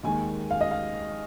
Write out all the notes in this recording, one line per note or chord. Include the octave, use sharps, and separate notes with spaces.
D#2 D#3 G#3 G#5
F5
D#5
F5